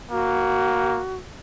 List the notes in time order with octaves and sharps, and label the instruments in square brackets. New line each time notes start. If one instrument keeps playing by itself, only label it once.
[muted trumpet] A#3 [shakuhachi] F#4